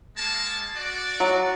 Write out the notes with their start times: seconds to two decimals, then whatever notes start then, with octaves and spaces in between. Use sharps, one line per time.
0.17 G#3 A#3 A5
0.75 F#4 D5
1.20 F#3